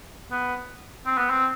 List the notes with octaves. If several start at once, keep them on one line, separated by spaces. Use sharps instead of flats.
B3
C4
B3
C4